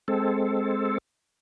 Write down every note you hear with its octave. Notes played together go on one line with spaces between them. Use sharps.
G#3 C4 A4